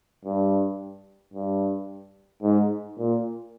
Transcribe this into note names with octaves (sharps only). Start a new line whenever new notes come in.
G2
G2
G#2
A#2